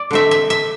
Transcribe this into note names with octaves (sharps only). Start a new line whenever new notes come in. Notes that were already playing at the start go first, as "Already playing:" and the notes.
Already playing: D5
D3 A3 C4 E5
E5
E5